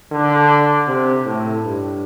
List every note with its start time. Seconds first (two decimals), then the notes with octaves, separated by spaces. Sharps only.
0.12 D3
0.87 C3
1.26 A2
1.64 G2